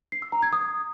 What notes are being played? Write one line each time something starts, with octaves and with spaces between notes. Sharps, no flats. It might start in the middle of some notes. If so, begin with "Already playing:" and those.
C7
E6
A#5
G#6
D#6